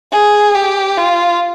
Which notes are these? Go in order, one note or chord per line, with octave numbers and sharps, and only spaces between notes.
G#4
G4
F4